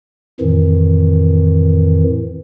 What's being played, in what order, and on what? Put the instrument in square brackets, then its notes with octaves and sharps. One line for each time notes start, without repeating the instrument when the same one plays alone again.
[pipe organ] F2 A2 D#3 E3